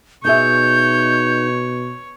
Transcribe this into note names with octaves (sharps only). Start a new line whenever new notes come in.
B2 D#4 G#4 C#5 E5 G6